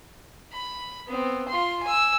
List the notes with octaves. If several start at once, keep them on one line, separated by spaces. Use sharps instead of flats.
B5
B3 C4
F4 C6
G#5 E6